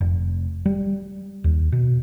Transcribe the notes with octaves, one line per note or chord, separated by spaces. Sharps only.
F1
G3
D#2
B2